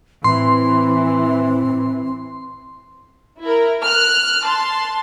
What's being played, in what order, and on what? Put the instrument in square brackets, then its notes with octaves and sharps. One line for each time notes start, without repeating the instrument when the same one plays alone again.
[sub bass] A2 [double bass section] E3 [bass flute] C4 [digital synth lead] C6
[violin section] E4 A#4
F6 F#6
A5 C6